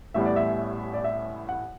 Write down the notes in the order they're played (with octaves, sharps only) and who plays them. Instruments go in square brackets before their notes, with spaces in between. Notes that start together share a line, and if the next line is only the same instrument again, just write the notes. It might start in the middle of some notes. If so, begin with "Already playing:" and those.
[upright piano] A1 A2 G3 B3 E5
D5
E5
D5
E5
F#5